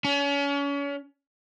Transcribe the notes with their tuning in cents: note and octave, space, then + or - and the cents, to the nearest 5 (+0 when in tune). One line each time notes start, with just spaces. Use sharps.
C#4 +35